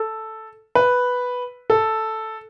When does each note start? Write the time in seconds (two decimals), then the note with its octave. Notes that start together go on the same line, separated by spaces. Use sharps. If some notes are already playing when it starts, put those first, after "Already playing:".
Already playing: A4
0.75 B4
1.70 A4